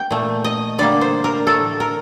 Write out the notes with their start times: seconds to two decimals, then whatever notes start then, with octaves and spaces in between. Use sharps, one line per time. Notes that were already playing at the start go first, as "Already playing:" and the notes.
Already playing: G5
0.11 A#2 A3
0.44 D#5
0.78 D3 G3 A#3 D5
1.01 C5
1.24 A#4
1.47 A2 A3 A4
1.80 A#4